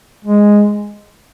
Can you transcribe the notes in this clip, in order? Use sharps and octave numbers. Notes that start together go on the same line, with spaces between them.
G#3